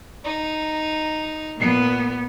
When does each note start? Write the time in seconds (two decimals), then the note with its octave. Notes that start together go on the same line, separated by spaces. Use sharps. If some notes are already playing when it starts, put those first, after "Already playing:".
0.24 D#4
1.58 A#2 B3